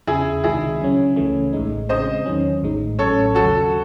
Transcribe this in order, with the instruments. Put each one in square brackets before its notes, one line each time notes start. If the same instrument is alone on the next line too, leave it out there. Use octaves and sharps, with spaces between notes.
[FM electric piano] E2 C#3 E3 [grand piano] E4 G#4
[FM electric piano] C#2 C3 D#3 G#3 D#4 [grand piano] E4 G#4
[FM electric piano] C#3 F#3 C#4
C#2 C#3 E3 A3 C#4
A1 A2 G#3 D#4
[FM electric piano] C#3 G#3 C4 [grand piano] C5 D#5
[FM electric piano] E2 D#3 F#3 C#4
A1 A2 G#3 D#4
[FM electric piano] A1 A2 F#3 C#4 [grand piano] A4 C#5
[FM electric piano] D#2 C#3 F#3 [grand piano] F#4 A4